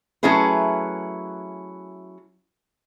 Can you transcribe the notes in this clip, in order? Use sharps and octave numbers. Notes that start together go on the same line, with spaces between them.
F#3 A3 C#4 E4 G#4 B4